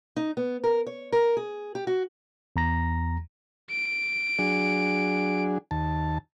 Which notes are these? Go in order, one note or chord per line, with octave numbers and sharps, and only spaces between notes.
D#4
B3
A#4
C#5
A#4
G#4
G4
F#4
E2 A#5 A#6
D7
F#3 D4 G#4
D#2 A5